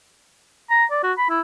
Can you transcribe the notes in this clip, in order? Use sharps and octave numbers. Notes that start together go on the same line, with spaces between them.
A#5
D5
F#4
B5
E4